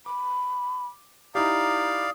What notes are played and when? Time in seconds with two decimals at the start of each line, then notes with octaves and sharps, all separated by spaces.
0.06 B5 D6
1.35 D#4 E4 G4 D5 F5 A#5 D#6